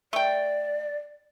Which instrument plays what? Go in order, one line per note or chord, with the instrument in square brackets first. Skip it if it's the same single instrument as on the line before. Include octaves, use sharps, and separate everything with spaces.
[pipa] A3 G5 [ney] D5